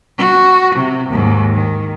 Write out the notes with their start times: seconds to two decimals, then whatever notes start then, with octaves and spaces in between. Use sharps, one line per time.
0.18 F#4
0.76 C3
1.09 D#2 G#2
1.54 D#3